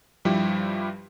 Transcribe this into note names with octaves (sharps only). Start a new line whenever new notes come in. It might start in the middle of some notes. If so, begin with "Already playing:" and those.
G2 F3 G3 E4 G4